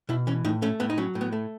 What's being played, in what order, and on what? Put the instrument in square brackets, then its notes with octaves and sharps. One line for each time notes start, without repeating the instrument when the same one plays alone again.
[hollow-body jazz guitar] B2 E4
E3 C#4
A2 D#4
A3 C#4
A2 B3
D#4
F#3 C#4
A2
B3
A3